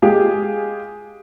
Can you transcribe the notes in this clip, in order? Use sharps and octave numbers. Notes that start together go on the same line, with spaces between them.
G#3 G4 G#4 F5